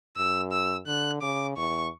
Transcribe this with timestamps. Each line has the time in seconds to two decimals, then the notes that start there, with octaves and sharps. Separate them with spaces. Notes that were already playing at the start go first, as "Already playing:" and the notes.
0.17 F#2 E6
0.52 E6
0.87 D3 F#6
1.22 C#3 D6
1.57 E2 C#6